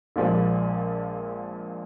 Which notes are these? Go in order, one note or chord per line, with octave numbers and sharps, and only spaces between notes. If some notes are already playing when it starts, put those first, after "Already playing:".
A#1 A#2 F3 G#3